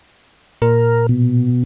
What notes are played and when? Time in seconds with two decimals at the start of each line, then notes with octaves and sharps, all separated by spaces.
0.62 A#2 A#4
1.09 B2